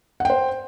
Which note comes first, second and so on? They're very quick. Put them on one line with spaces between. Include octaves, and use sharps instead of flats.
F#5 G5 C5